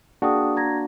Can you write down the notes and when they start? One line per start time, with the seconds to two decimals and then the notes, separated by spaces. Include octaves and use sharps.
0.22 A#3 D4 F#4 G#4 G5 D#6
0.57 A#5 G#6 A#6